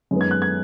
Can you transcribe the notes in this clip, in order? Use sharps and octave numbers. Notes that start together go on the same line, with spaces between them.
F#2 D#3 G#3 B3
G#6
F#6
G#6